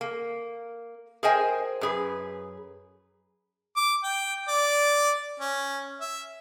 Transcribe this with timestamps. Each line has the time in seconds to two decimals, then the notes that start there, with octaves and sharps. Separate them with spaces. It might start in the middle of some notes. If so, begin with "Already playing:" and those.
0.01 A#3
1.23 G#4 A#4 C5 D#5 G5 G#5
1.81 F#2 G#4 B4
3.76 D6
4.03 G5
4.48 D5
5.40 C#4
6.00 E5